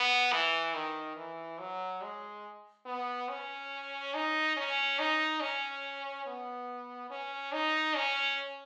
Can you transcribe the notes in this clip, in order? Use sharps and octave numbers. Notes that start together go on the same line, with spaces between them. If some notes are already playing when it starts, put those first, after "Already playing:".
Already playing: B3
E3
D#3
E3
F#3
G#3
B3
C#4
D#4
C#4
D#4
C#4
B3
C#4
D#4
C#4